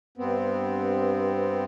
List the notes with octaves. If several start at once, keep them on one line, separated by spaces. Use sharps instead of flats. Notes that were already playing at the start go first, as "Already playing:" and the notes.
G2 B3 C4